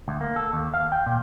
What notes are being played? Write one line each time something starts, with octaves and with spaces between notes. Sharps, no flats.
D2
A#3
A4
D#2
F5
G5
A#2